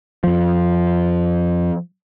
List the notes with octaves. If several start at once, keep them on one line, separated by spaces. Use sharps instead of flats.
F2 F3